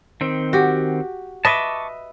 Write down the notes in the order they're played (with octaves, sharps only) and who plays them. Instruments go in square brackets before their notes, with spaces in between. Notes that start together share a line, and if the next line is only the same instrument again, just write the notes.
[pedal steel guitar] D#3 C4
[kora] F#4 G4
[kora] B4 D#5 E5 [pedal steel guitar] A5 C#6 D6